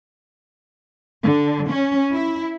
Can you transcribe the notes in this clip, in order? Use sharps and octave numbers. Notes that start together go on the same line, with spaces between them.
D3
C#4
E4